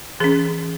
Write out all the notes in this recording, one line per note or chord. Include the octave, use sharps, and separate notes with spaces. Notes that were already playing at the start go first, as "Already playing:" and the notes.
E3 C#4 G#4